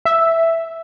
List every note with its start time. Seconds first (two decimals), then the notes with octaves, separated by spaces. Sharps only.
0.05 E5